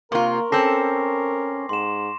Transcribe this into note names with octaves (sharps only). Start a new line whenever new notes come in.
C3 A#3 F4 A#4 C6 C#6
C4 C#4 A4 D6 A#6 C7
G#2 C6 E7